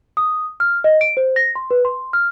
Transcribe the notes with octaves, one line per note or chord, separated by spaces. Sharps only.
D#6
F6
D#5
D7
C5
A#6
C6
B4
C6
F6